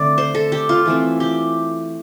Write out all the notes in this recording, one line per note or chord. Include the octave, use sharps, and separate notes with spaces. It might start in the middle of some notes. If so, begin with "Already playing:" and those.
Already playing: D3 A3 C4 D5
C5
A4
G4
F4
E3 A3 C4
G4